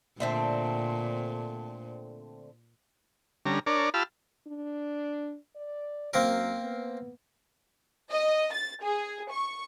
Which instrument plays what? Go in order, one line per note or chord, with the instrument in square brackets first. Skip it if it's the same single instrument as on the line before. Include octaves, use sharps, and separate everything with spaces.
[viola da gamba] A#2 [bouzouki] D3 A3 C4
[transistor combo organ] D3 G3 C#4 A#5
D4 A#4 C#5 D5
F4 G4 A5 B5 E6 F6
[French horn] D4
D5
[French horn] F#2 [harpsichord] A#3 C4 A#4
[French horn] B3
[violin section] D#5
A6
G#4
C#6